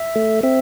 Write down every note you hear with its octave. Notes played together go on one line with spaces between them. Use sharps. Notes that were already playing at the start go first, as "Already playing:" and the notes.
Already playing: E5
A3
C4 E5